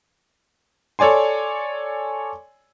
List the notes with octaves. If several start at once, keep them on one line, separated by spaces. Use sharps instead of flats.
A4 C#5 D5 G#5 C6